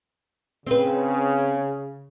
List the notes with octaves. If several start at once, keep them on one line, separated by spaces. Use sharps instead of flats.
C#3 C4 B4